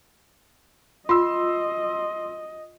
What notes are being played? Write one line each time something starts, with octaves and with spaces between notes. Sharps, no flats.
F4 D#5 C6 E6